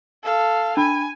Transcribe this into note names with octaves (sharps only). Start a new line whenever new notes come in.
A4 F5
D4 G#5 B5